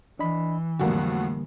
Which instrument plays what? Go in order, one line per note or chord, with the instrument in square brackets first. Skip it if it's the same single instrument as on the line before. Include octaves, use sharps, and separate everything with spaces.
[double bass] E3 [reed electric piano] D4 D#5 B5
[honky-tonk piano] F2 A2 F#4 [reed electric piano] D3 G3 A#3